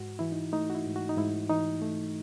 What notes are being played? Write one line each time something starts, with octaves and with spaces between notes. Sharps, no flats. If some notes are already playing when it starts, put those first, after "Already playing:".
Already playing: G#2 F#4
E3 E4
D#4
A3 D#4
F#4
E4
G#2
F#4
D#4
G#2 E4
E3 D#4
A3